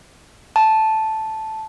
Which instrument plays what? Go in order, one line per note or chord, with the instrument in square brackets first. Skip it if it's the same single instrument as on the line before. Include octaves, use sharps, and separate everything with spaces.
[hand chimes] A5